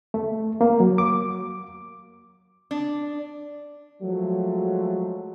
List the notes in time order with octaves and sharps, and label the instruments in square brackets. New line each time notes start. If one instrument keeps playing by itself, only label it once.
[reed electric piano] A3
A#3
F#3
D6
[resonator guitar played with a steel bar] D4
[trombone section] F3 F#3 G#3 A3